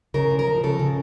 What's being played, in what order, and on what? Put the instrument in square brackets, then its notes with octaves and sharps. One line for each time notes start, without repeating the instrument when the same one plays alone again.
[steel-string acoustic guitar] C#3 A#4
F3
A#4
F3
C#3 A4
C#3